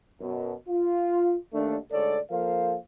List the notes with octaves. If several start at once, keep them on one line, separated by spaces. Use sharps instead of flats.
F#2 B2
F4
D#2 A3 D4
D2 G#2 A4 C#5 D5
F3 A#3 A4 A#4 C5 F5